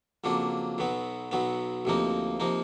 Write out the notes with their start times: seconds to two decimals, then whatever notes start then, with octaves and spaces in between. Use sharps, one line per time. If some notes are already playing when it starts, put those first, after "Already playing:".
0.24 F2 C#3 F#3 A#3 D4
0.78 B1 B2 F#3 B3
1.31 B1 B2 F#3 B3
1.85 D2 C3 F3 A#3 D#4
2.40 C3 F3 A#3 D#4